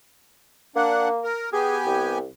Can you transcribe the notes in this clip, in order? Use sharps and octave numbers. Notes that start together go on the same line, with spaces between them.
A#3 D4 F#5
A#4
B3 G4 G#4 G#5
C2